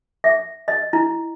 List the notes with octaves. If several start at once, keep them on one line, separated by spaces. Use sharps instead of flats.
E5
D#5
E4